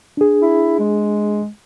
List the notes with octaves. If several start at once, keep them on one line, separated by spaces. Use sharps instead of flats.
D4 G#4
E4
G#3